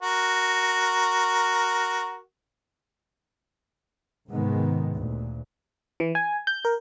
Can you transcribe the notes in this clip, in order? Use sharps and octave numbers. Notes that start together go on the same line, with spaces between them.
F#4 A#4
G#2 C3 D#3 G#3 B3
D2 A#2
E3
G#5
G6
A#4